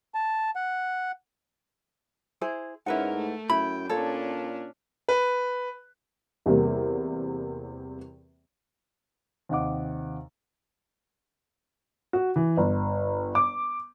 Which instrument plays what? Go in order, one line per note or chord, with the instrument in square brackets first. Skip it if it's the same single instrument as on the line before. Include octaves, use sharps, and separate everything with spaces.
[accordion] A5
F#5
[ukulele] E4 G#4 C5
[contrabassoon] G#2 [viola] C#4 A#4 [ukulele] E4 B4 F#5
[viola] A3
[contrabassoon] F#2 [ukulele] E4 [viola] G5 [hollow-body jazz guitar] B5
[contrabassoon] A#2 [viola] C#4 D4 [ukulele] A4 C#5
[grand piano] B4
[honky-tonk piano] E2 C3 G3 A#3
[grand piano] D#2 C3 D#5 F#5 D6
[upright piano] F#4
E3
G1
D6